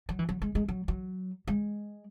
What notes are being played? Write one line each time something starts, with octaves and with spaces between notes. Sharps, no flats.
F#3
E3
F#3
G#3
G#3
F#3
F#3
G#3